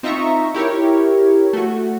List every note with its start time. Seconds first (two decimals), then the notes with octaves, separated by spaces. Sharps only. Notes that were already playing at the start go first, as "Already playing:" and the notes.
0.03 C4 D#4 F4 E5 A#5 C#6
0.54 E4 G4 A#4 C#5
1.53 A3 F#4